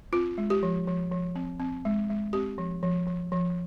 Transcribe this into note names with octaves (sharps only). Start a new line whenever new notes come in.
C4 F4
G#3
G4
F3
F3
F3
C4
C4
G#3
G#3
C4 G4
F3
F3
F3
F3